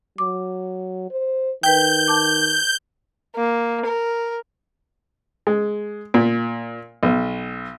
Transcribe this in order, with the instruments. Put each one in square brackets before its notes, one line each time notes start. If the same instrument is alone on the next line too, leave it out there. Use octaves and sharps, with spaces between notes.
[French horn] F#3 [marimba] D6
[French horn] C5
[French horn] D#3 [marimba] B4 G5 [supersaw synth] G6
[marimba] A5 D6
[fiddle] A#3
A#4
[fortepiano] G#3
A#2
B1